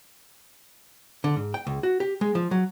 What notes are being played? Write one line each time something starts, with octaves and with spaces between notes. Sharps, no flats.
D3
G#2
G5
C#2
F#4
G4
G#3
F3
F#3